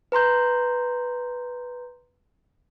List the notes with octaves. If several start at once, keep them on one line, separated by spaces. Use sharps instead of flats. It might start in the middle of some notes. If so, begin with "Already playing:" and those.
B4 A#5 C6 G6